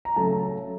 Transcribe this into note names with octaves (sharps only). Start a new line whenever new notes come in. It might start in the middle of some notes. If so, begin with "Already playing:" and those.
A#5
C#3 F#3 A3 A5